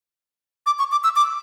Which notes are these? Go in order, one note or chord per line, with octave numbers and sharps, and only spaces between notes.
D6
C#6
D6
E6
D6